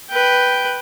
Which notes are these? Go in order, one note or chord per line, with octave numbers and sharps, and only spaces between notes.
B4 G5